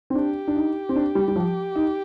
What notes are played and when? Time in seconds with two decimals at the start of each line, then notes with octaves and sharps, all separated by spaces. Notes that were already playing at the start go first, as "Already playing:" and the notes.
0.10 C4
0.15 D4 G4
0.48 D4
0.55 D#4
0.89 C4
0.96 D4
1.15 G3
1.28 G3
1.36 F3
1.76 D#4